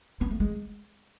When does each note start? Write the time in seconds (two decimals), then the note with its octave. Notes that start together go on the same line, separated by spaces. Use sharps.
0.21 B3
0.31 A3
0.40 G#3